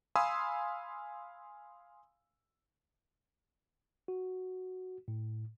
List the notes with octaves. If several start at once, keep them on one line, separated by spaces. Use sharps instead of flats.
F5 G#5 B5 C6 D#6 E6
F#4
A2